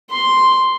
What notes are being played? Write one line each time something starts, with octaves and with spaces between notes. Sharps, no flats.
C6